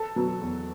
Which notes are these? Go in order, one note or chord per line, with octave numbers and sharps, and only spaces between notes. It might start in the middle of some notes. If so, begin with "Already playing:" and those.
Already playing: A4 A5
B2 F#3 B3
E2